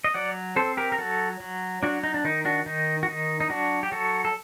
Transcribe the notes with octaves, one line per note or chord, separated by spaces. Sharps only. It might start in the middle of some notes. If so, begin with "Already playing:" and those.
D#5
F#3 D5 F#5
C4 A4 C5
G4 A#4
A#4
F#3 F#4 A4
F#3
F#3 D4 F#4
D#4
D4
D#3 D#4
D4 F#4
D#3 D#4
F#4
D#3 D#4
D#4
F#3 D4 F#4
G4
F#3 F#4 A4
A4